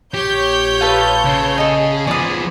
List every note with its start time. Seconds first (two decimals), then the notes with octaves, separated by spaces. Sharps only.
0.14 A#1 G4 C#5 G6
0.81 F4 A4 B4
1.25 C#3
1.58 G#4 A4 D#5
2.07 F3 B3 D5 D#6